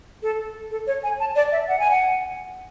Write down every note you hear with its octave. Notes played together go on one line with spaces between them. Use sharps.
A4
A4
C#5
G#5
A5
D5
E5
F#5
G#5
F#5